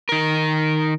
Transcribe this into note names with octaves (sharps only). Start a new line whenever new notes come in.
D#3 A#4